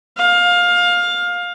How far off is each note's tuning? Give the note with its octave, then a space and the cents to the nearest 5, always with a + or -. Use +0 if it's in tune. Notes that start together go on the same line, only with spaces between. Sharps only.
F5 +20